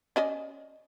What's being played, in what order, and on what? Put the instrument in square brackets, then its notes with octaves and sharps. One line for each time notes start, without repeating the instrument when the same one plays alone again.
[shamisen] C#4 D5 D#5